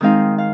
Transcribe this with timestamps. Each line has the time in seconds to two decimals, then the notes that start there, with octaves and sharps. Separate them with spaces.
0.01 D#3 G#3 C4 D#4 F5
0.38 F5